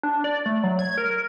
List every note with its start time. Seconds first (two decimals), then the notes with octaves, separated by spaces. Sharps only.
0.03 D4
0.24 D5
0.46 A3
0.64 F#3
0.79 G#6
0.98 A#4